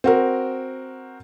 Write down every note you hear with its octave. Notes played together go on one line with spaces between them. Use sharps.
C4 F#4 A#4